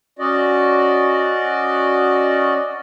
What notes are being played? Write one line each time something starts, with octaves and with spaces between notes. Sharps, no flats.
C#4 F#4 D5 D#5